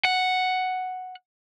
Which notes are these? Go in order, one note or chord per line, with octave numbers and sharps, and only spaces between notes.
F#5